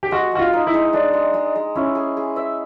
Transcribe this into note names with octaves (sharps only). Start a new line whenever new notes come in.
G4
G#3 F#4
G#3 F#4
F4
D#4
E4
G#3
G#3 D4
G#3
G#3
G#3
C#4 E4
G#4
G#4
E5